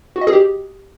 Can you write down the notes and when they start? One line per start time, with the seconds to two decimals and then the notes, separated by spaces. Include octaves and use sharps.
0.16 F#4
0.21 D#5
0.27 G#4
0.33 G4